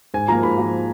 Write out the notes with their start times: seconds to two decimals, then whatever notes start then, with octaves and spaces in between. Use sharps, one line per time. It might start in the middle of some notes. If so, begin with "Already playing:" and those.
0.14 G#2 G#5
0.28 F3 A#3 A#5
0.43 G#2 B5
0.57 F3 A#3